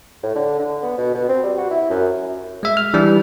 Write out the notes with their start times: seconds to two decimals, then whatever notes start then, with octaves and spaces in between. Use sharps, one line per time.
0.23 A2
0.35 D3
0.59 D3
0.83 B3
0.98 B2
1.14 B2
1.28 C4
1.43 G3
1.58 F#4
1.71 E4
1.90 F#2
2.63 G#3 E5
2.77 F6
2.94 E3 G3 D4